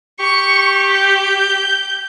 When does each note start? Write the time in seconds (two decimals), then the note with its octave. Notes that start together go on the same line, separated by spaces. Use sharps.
0.20 G4 C#6
0.93 G6